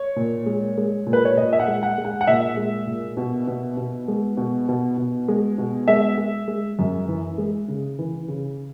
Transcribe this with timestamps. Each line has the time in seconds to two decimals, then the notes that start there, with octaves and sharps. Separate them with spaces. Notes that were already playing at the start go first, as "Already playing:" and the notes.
Already playing: C#5
0.16 A#2
0.46 G#3
0.78 G#3
1.07 A#2
1.13 B4
1.25 C#5
1.37 A#2 D#5
1.53 E5
1.60 F#5
1.68 G#3
1.83 F#5
1.98 G#3
2.05 F#5
2.21 F#5
2.27 A#2 E5
2.57 G#3
2.87 A#2
3.17 B2
3.47 B2
3.77 B2
4.08 G#3
4.37 B2
4.68 B2
4.97 B2
5.28 G#3
5.58 B2
5.88 G#3 E5
6.18 G#3
6.48 G#3
6.79 F#2
7.08 E3
7.38 G#3
7.68 C#3
7.99 E3
8.28 C#3